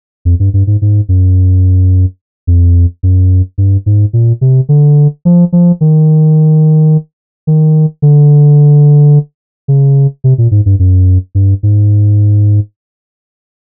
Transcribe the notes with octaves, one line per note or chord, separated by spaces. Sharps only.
F2
G2
G2
G#2
G#2
F#2
F2
F#2
G2
G#2
A#2
C3
D3
F3
F3
D#3
D#3
D3
C#3
C3
A#2
G#2
G2
F#2
G2
G#2